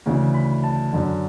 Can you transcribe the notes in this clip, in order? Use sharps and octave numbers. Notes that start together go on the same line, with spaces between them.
D2 C#3 E3
B5
A5
F#2 D3